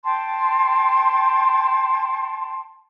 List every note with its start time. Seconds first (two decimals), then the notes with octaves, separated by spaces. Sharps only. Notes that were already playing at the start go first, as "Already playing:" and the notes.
0.04 G5 A5 C6